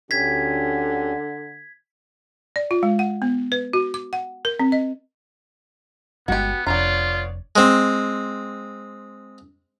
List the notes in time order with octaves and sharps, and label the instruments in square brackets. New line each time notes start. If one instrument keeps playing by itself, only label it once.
[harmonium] D2 C#4 G4 [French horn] D3 [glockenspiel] G#6 B6
[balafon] D5
F4
G#3
F#5
B3
B4
F#4
D6
F#5
A#4
C4
D#5
[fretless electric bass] G1 G#3 [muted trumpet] B3 [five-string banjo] F#4 G4
[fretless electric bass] F1 D4 [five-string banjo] B3 A#5 [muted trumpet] F4 [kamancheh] C#5 D5
[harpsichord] G#3 C4